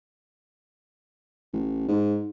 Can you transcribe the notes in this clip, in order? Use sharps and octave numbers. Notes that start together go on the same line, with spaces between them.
A1
G#2